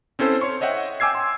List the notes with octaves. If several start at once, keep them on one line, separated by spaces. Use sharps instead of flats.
C4 C#4 E4 A4 C5
C#5 C6 C#6
C#5 D#5 E5 F#5 G5
G5 G#5 D6 E6 G#6 C7
C6